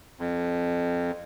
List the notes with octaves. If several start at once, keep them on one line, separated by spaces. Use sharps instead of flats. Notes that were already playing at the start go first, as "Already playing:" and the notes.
F2